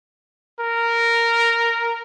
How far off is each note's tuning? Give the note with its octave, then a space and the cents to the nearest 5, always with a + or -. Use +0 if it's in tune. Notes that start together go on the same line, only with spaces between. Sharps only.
A#4 -5